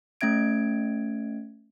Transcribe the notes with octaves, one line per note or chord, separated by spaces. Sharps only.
A3 C#4 E5 G#6 D7